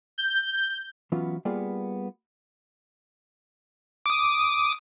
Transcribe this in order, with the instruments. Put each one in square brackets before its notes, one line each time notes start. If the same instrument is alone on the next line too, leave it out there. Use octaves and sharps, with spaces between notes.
[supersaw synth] G6
[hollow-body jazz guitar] E3 F#3 B3 C#4 F4
G3 A#3 B3 F4 G#4 D5
[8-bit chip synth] D6 D#6